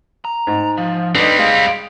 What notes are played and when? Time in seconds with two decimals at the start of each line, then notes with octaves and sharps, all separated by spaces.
0.25 A#5
0.47 G#2
0.78 F3
1.15 G3 C4 D4 D#4 B4
1.39 G#3 F5